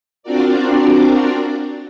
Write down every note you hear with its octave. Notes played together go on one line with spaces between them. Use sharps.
C4 D4 F4 F#4 A#4 D5